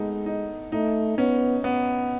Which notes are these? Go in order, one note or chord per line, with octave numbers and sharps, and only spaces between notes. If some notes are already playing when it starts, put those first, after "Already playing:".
Already playing: G#3 A3 B3 D#4
D#4
A3 D#4
B3 C#4
B3